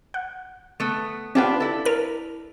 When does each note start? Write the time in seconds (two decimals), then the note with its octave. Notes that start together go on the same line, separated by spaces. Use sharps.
0.14 F#5
0.80 A3 B3
1.35 C4 D4 F4 G4 B4 F#5
1.60 E4 A4
1.85 A#4 F6